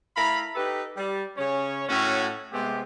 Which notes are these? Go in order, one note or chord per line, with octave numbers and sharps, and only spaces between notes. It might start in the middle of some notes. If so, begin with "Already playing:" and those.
A3 E4 F5 A#5 B5
D#4 G4 A4 B4
G3
C#3 C#4 C#5
A2 C#4 F#4
C3 G#3 A3 B3 C4 G4